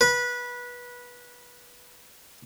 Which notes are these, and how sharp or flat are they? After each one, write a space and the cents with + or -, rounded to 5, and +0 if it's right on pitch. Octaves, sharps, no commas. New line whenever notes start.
B4 -20